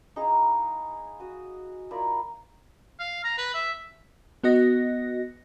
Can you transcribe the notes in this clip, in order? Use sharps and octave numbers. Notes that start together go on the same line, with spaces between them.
D#4 E4 G#4 F5
F#4 D#6
E4 F4 A#4 D5
F5
A#5
B4
E5
B3 F#4 D#5 A#6